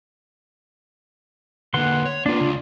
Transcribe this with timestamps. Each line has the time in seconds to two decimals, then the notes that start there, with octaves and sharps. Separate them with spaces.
1.74 D3 A#3 B4 F#5 C6
2.05 C#5
2.26 A#3 D4 F4 B4
2.39 C#2